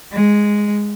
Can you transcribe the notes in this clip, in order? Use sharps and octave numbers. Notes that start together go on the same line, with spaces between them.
G#3